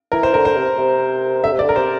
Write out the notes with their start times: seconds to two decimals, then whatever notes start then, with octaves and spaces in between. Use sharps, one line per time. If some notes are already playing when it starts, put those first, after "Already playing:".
0.12 E3 A#4
0.23 C5
0.33 D3 A#4
0.45 C5
0.56 C3
0.78 C3
1.43 D3 E5
1.52 C3
1.59 D3 D5
1.69 A#4
1.76 C3 C5